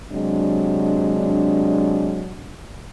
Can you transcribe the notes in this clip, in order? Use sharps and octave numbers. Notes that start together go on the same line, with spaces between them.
C3 F#3 G#3 D4